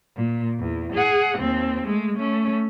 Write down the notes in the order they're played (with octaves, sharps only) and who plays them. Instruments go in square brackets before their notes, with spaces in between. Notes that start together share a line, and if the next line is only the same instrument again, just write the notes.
[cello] A#2
E2
G#4 F#5
D#2 C4
G#3 A3
A3 C#4